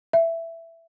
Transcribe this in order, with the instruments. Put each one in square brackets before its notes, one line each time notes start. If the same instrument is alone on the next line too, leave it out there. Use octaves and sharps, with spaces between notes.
[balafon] E5